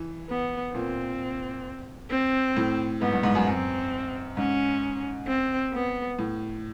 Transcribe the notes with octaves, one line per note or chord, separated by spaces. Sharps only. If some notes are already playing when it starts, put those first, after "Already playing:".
Already playing: E3
B3
A#2 C4
C4
A2
G#2 B3
G2
G#2
F#2
F#2 C4
G#2 C#4
C4
B3
A2